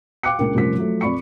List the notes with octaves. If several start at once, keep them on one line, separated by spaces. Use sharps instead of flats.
F5 G5 D6 F#6 C#7
C#2 A#3 D4 A#4 G5
F1 F3 G3 C#4 A#4 B6
F3 F#3 A3
F2 D5 B5 C#6 C#7